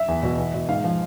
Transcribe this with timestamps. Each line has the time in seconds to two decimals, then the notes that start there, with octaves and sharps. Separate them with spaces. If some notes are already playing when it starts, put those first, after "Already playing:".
Already playing: E5
0.08 E2
0.23 B2
0.38 E2
0.54 B2
0.69 G#2 F5
0.84 F3